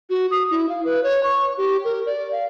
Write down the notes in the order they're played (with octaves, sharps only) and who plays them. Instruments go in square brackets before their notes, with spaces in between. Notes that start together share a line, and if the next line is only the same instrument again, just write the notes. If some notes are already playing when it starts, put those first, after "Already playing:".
[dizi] F#4
D#6
E4
F5
B4
C#5
C#6
G4
A#4
D5
F5